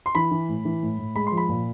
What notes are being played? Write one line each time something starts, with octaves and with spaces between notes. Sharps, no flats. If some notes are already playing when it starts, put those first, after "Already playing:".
C6
E3 B5
E3
A2
E3
A2
A2
G#3 B5
C6
F3
B5
A#2